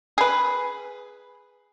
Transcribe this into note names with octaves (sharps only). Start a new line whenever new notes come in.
G#4 B4